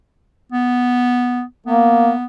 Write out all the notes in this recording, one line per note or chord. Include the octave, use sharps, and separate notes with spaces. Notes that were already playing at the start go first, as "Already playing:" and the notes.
B3
A#3 B3